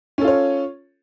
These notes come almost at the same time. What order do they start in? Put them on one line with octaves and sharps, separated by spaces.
C#4 A4 F4 C#5